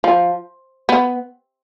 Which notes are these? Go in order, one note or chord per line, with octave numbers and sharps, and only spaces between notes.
F3
B3